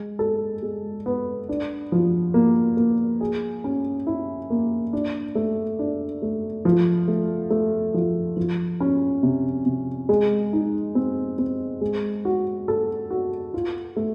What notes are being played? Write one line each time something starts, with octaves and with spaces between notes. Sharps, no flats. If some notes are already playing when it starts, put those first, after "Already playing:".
Already playing: G#3
A4
G#3
B3
D4
F3
A#3
A#3
G#4
C#4
E4
A#3
D4
A3
D4
A3
F3
A3
A3
F3
F3
C#4
C3
C3
G#3
D#4
C4
C4
G#3
F#4
A4
F#4
F4
A3